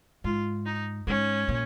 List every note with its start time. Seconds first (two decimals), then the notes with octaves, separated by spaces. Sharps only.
0.24 G#2 F4
0.66 D#4
1.07 G#2 C#4
1.49 A#2